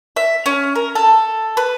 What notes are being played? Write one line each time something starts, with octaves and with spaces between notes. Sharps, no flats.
E5
C#4
A#4
A4
B4